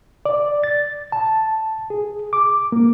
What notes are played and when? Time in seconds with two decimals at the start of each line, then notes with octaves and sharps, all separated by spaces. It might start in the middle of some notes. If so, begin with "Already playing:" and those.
0.26 D5
0.64 A6
1.12 A5
1.90 G#4
2.33 D6
2.72 A#3